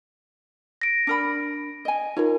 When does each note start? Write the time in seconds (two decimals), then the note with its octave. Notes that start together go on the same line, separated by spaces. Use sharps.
0.82 A#6 D7
1.07 D4 A#4 B5
1.85 D#5 G#5
2.17 D#4 F4 A#4 C#5